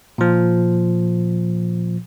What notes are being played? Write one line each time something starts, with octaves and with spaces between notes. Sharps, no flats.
A#2 F3